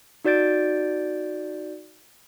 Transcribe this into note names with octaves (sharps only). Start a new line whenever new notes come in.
D#4 F#4 D5 G6 A6 D7